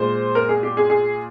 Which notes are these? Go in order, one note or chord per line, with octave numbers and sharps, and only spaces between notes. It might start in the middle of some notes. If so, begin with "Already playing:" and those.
Already playing: A#2 G#3 C5
A#4
G#4
G4
G#4
G#4